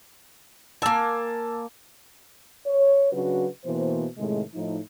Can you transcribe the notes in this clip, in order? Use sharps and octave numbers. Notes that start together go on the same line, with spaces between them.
A#3 G#5 A5 E6
C#5
C#3 F#3 D4 F#4 B4
B2 E3 A#3 C5
A2 C3 D#3 G#3
A2 F3 D#4